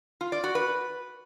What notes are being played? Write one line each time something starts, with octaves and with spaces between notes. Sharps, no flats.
F4
D5
F#4
B4